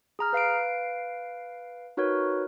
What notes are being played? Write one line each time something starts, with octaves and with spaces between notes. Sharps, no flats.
G#4 A#5 F6
B4 F5 C7 D7
D#4 F#4 A#4 B4 C#5